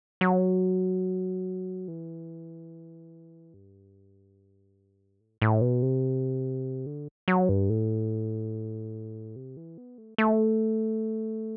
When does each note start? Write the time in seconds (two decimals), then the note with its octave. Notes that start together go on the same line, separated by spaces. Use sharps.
0.21 F#3
1.88 E3
3.54 G2
5.20 A2
5.42 A2
5.62 B2
5.82 C3
6.86 D3
7.28 F#3
7.49 G2
7.70 A2
9.36 C3
9.57 E3
9.78 B3
9.98 A3
10.18 A3